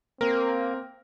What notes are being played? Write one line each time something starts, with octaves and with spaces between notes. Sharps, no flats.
A#3 C4 A#4